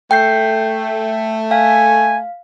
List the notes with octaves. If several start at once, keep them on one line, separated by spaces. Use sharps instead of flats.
A3 G5 G6 C7
F5 G#5